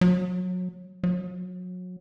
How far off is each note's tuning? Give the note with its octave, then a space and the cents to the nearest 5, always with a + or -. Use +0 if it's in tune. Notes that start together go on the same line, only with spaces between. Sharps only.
F#3 -25
F#3 -30